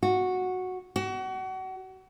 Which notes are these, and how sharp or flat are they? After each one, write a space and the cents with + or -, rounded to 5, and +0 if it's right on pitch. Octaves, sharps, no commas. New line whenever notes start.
F#4 -5
F#4 +30